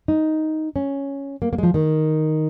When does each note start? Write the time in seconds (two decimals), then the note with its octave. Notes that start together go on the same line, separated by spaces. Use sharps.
0.08 D#4
0.76 C#4
1.42 A#3
1.53 A#3
1.58 G#3
1.63 F3
1.74 D#3